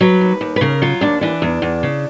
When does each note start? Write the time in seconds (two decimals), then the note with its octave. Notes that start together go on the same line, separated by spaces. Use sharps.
0.01 F#3 B4
0.21 D#2
0.41 D#2
0.56 B4
0.61 C#3 A#4
0.82 F#3 F4
1.01 D#2 D4
1.21 E3 D4
1.42 E2
1.62 E2
1.83 C#3